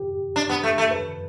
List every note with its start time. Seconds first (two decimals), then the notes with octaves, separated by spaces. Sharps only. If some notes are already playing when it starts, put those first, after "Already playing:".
Already playing: G4
0.36 D4
0.50 B3
0.63 A3
0.78 A3
0.91 B4